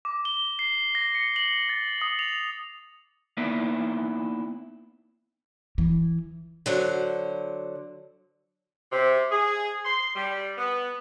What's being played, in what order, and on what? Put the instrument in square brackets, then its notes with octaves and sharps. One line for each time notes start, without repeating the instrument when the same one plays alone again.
[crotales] D6
G7
C7
A#6
C#7
F#7
A6
D#6
F7
[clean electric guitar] A#3 B3 D#4 E4 B4 D5
[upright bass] E3
[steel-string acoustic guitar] D3 F#3 C5
[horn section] C3
G#4
C6
G3
B3